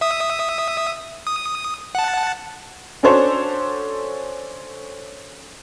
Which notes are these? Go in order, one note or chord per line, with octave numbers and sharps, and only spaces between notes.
E5 D#6
D#6
F#5 A5
C#4 D4 F#4 A4 C5 C#5